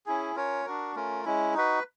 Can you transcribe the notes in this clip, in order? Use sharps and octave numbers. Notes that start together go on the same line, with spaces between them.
C#4 E4 G#4
C#4 F4 A#4 C#5
D4 F#4 A#4
A3 C#4 F4 A#4
G#3 C#4 E4
D#4 F#4 B4